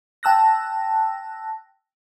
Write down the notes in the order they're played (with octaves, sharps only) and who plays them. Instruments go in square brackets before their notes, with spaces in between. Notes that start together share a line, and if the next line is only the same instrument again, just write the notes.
[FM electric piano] G5 A5 E6 F#6 A#6